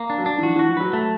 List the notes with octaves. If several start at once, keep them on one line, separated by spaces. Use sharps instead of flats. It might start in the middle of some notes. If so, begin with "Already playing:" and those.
Already playing: A#3
D4
F#3
D4
E3
F3 F#4
E3
F#4
F3
F#3 B4
A3